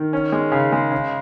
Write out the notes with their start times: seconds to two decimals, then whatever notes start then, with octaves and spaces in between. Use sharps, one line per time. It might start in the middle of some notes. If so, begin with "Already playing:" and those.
Already playing: D#3
0.13 C#4
0.32 G#3
0.52 C#3
0.72 G#3
0.92 C#3